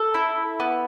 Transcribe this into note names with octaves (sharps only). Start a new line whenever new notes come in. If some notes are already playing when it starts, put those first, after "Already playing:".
Already playing: A4
E4
B3